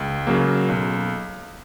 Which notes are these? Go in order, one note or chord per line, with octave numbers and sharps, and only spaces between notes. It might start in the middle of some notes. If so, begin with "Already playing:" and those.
Already playing: C#2
C#3 F#3 A#3
B1